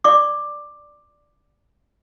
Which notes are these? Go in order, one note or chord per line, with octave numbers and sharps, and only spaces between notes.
D5 C#6 D6